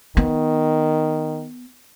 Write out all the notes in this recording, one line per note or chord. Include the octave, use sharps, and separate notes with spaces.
D#3 B3